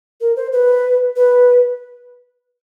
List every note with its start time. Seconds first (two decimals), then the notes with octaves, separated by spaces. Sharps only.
0.21 A#4
0.36 C5
0.53 B4
1.16 B4